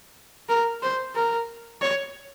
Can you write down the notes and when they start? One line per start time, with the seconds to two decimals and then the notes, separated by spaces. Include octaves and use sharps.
0.49 A#4
0.82 C5
1.15 A#4
1.82 C#5